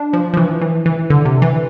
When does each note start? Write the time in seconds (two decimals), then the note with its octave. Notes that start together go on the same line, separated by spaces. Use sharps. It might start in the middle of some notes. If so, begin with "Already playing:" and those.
Already playing: D4
0.13 F3
0.34 F3
0.37 E3
0.61 E3
0.86 E3
1.10 D3
1.25 C3
1.42 E3